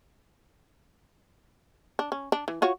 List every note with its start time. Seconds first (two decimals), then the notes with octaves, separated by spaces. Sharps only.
1.99 D4
2.12 C#4
2.32 D4
2.48 E3
2.62 F4 F#4 C#5